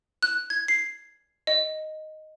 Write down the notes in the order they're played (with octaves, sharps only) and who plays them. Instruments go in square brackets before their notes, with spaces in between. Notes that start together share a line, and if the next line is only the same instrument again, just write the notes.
[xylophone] F#6
G#6
C7
D#5